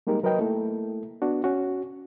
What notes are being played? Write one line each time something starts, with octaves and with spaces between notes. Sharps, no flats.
G3 G#3 A#3 D#4 G4 A#4
F#3 A#4 B4 D#5 G5
A3 A#3 E4 A4
B3 D4 F#4
C#4 F#4